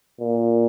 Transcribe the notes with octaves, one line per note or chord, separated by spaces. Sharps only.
A#2